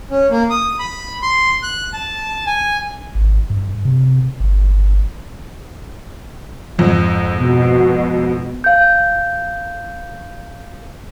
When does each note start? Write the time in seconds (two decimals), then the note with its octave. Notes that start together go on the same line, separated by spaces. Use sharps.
0.10 C#4
0.30 A#3
0.50 D#6
0.79 B5
1.23 C6
1.63 F#6
1.93 A5
2.47 G#5
3.15 G#1
3.50 G2
3.85 C3
4.40 G1
6.78 F2 G#2
7.37 B2
8.64 F5 G6